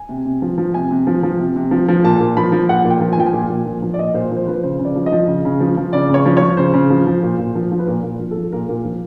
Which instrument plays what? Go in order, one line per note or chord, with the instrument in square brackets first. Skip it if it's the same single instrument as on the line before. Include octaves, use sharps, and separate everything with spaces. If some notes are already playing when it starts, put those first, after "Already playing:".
Already playing: [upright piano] G#5
C3
C3
F3
F3
C3 G#5
C3
F3
F3
C3
C3
F3
F3
A#2 A5
A#2
F3 B5
F3
A#2 F#5
A#2
G5
F3
G#5
F3 G5
G#5
A#2
A#2
F3
F3
D5
A#2 D#5
A#2 C5
F3
C5
F3 B4
C#3 C5
C#3
D5
F3
D#5
F3
C#3
C#3
F3
F3
C#3 D5
C#3 C#5
F3
F3 C#5
C#3 C5
C#3
F3
F3
A#2
A#2
F3
F3
B4
A#2 A#4
A#2
F3
F3 A4
A#2 A#4
A#2
F3